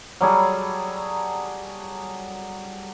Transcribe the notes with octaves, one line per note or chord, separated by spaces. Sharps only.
F#3 G3 G#4 A4